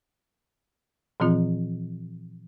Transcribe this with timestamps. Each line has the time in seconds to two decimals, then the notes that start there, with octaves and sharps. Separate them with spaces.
1.20 A#2 E3 F3 C4 F4